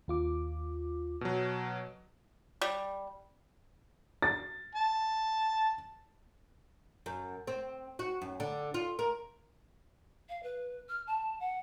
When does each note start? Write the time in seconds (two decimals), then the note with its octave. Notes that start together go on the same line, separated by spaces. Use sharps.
0.08 D#2 F4 D6
1.21 B2 F#3
2.61 G3
4.22 A6
4.75 A5
7.06 F#2
7.47 C4
7.99 F#4
8.22 F#2
8.40 D3
8.74 F4
8.99 A#4
10.29 F5
10.43 B4
10.89 F6
11.07 A5
11.40 F#5